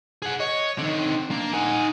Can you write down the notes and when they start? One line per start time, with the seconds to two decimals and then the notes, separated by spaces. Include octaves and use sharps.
0.22 G#4 F#5
0.40 C#5 D#5
0.78 D3 D#3 C4
1.31 A#3 D4
1.53 D#4 F#5 G#5